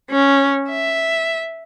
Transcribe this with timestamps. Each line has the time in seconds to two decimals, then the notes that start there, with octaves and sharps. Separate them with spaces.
0.10 C#4
0.69 E5